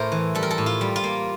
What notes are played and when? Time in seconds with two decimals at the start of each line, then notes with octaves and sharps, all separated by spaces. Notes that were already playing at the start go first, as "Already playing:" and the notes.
Already playing: A2 A3 A#4 C5
0.12 E3
0.35 G3 A4
0.43 A#4
0.51 A4
0.58 A2
0.66 F4
0.81 G3
0.96 F4
1.04 A#3